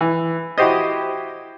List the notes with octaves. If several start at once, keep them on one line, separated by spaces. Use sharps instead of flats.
E3
E4 F#4 G4 C5 D#5